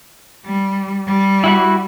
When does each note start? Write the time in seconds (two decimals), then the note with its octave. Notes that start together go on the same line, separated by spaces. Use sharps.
0.46 G3
1.07 G3
1.44 E4 F#4 B5